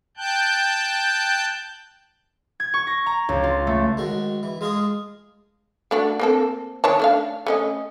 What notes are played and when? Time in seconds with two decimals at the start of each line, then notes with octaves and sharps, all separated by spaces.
0.17 G5 A5 F#6 G6
2.60 G#6
2.74 C#6
2.87 A#6
3.06 A#5
3.29 C#2
3.44 F4
3.67 A3
3.97 G#2 D#3 F#4
4.43 E3
4.61 G#3 F4 G#4 A5 D#6
5.91 A3 D4 F#4
6.19 A#3 C4 A4
6.84 D#3 C#5 A5
7.00 A3 D4 F5
7.46 A3 C#4 D#5